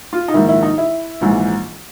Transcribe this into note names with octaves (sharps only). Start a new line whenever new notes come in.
F4
D#4
A#1 G#2 D#3 E4
E4
D#4
E4
A#1 G#2 E3